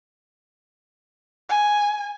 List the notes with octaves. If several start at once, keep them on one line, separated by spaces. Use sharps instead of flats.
G#5